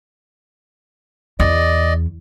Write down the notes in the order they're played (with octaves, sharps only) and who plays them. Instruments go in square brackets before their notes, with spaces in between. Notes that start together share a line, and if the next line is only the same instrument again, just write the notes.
[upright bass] E2 [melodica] D5 D#5